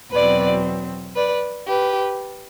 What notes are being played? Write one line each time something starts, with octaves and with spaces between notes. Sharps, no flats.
E2 B2 F#3 C4 B4 D5
B4 D5
G4 B4